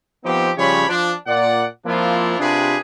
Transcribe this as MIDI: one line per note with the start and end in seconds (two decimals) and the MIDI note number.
0.25 0.50 53
0.25 0.50 59
0.25 0.50 60
0.25 0.50 63
0.25 0.50 67
0.57 0.85 49
0.57 0.85 53
0.57 0.85 55
0.57 0.85 67
0.57 0.85 73
0.57 0.85 83
0.88 1.13 53
0.88 1.13 62
1.27 1.65 46
1.27 1.65 74
1.27 1.65 78
1.86 2.39 53
1.86 2.39 58
1.86 2.39 60
1.86 2.39 62
1.86 2.39 64
1.86 2.39 65
2.40 2.77 48
2.40 2.77 62
2.40 2.77 65
2.40 2.77 67
2.40 2.77 68
2.40 2.77 71